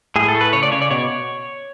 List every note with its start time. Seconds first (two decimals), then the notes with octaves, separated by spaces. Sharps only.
0.16 A2 G#4
0.28 A4
0.35 A3
0.41 B4
0.53 C#3 C#5
0.63 D5
0.72 C#3 C#5
0.82 D5
0.91 B2 C#5